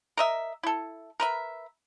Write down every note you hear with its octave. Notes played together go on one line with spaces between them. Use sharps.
A#4 D#5 E5
E4 A4
A#4 B4 E5